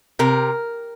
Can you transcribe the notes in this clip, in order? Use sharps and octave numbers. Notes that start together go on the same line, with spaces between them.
C3 A#4